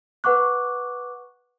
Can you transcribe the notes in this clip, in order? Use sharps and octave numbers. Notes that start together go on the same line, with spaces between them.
B4 F#5 C#6 D6 F#6